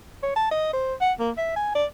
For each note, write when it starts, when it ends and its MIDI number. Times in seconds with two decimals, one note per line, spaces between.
0.23 0.36 73
0.36 0.50 81
0.51 0.73 75
0.73 0.94 72
1.01 1.13 78
1.20 1.31 58
1.38 1.51 76
1.56 1.72 80
1.75 1.85 74